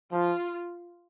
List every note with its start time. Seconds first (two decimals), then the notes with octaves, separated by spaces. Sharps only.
0.12 F3 F4